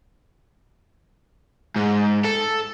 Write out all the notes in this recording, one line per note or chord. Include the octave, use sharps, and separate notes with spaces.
G#2
A4